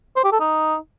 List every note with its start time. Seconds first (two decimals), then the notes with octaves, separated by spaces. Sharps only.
0.16 C5
0.24 G4
0.32 A4
0.40 D#4